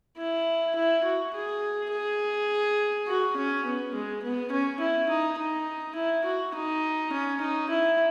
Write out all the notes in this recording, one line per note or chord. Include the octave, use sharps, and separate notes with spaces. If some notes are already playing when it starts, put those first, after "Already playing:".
E4
E4
F#4
G#4
G#4
F#4
C#4
B3
G#3
B3
C#4
E4
D#4
D#4
E4
F#4
D#4
C#4
D#4
E4